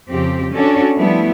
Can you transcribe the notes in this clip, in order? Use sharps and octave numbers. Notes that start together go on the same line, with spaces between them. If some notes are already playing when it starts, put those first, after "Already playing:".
F2 C#3 C4 G4
C#4 D4 F#4 A4 D5
F3 G3 A3 B3 E4